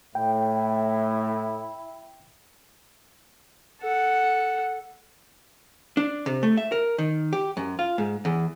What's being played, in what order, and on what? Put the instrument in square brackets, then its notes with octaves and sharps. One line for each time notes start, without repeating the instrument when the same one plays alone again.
[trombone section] A2 [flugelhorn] E4 [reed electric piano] G5
[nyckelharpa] A4 F#5
[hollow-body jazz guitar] D4
C3
A3
E5
A#4
D#3
G4
F#2
F4
G#2
E2